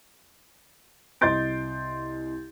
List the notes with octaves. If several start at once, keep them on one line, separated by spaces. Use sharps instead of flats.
C2 D#5 C6 G6 A6 D7